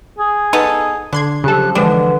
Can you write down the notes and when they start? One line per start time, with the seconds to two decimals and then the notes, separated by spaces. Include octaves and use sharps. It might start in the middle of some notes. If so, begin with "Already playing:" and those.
0.19 G#4
0.53 B3 D#4 A4
1.13 D3 D4 C6 G#6
1.44 C#3 F3 F#3 G4 A4 F#6
1.75 D3 E3 F3 G3 G#3 D4 B4